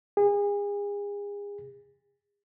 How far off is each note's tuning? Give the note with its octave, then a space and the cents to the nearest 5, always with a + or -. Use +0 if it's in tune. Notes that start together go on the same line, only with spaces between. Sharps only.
G#4 -35